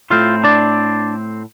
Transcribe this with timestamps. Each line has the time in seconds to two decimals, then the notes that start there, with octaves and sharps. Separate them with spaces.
0.10 A2 A3 C4 F4 F5
0.44 D4 D5